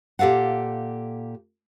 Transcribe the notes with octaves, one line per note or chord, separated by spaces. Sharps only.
A#2 G4 A4 F5 F#5